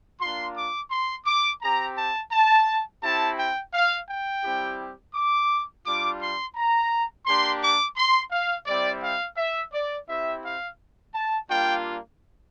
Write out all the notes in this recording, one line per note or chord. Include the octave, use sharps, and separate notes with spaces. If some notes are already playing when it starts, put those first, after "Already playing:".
A#3 D4 F4 C6
D6
C6
D6
C4 G4 A#5
A5
A5
C4 E4 G4 A5
G5
F5
G5
G3 C4 E4 G4
D6
G3 D4 F4 D6
C6
A#5
A#3 D4 G4 C6
D6
C6
F5
G3 C4 E4 D5
F5
E5
D5
C4 E4 G4 E5
F5
A5
G3 A#3 D4 F4 G5